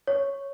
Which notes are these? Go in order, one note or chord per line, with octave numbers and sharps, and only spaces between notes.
C#5